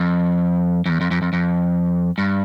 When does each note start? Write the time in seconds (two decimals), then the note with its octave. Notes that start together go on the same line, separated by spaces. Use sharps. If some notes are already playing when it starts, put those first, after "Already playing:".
Already playing: F2
0.86 F2
0.89 E2
1.01 F2
1.11 F2
1.22 F2
1.33 F2
2.18 G2